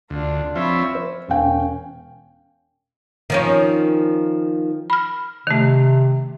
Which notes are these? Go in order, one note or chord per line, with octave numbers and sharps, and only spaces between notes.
D2 D4 F4
F3 C4 C#5 E5 B5
C5
E1 C#4 F5 G5 G#5
D#3 F3 C#4
B5 F6
C3 D#3 A3